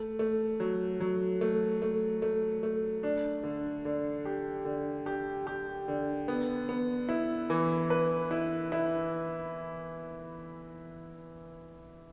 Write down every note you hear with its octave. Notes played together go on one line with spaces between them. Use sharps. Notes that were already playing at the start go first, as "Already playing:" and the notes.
Already playing: A3
A3
F#3
F#3
A3
A3
A3
A3
D4
D3
D3
G4
D3
G4
G4
D3
B3
B3
E4
E3
B4
E4
E4